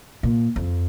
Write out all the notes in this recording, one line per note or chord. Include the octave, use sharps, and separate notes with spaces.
A#2
F2